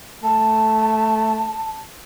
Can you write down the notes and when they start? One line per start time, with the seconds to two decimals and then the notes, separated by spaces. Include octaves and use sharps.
0.23 A3 A5